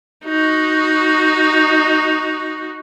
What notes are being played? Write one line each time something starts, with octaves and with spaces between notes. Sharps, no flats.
D#4 F#4